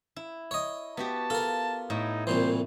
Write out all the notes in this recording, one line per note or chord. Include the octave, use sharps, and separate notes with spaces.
E4
C#5 D#5
B3 F#4 G4 A5
F4 A4 A#4
A2 D#4 E4
C2 A#2 E3 C5